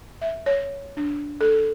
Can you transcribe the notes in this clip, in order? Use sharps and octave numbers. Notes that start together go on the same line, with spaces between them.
E5
C#5
D4
A4